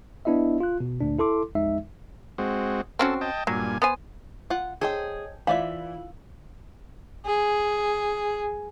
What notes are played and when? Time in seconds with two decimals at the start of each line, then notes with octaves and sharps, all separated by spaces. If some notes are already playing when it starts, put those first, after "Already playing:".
0.25 B3 D4 E4 D#5 E5
0.60 F4 F#6
0.80 B2
1.01 D2 A#2 D4
1.19 E4 A4 C6 D6
1.55 A1 F2 G#3 D#4 E5
2.38 G#3 C4 F#4
2.99 C4 C#4 F#4 A4
3.21 D#5 G5 A5
3.47 G2 A#2 F#3 G#5
3.82 B3 C5 G#5
4.50 F4 F#5
4.81 G#4 A4 C5 C#5 D#5 G5 G#6
5.47 E3 E4 F4 C5 D5 E5 F5 F#7
7.26 G#4